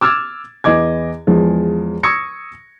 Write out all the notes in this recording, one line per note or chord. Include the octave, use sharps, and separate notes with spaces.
D6 E6 F6 G#6 A6 E7
E2 E3 D#5 D6 G#6
E2 F3 G#3
C#6 D#6 E6 G#6 A#6 C#7